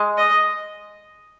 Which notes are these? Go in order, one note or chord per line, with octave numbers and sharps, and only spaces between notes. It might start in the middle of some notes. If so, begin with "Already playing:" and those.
Already playing: G#3
D#5